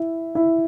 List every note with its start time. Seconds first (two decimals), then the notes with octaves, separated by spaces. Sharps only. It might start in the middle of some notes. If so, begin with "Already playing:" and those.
Already playing: E4
0.35 E4